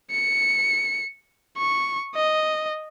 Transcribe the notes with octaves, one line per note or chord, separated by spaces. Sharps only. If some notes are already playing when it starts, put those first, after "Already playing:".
C#7
C#6
D#5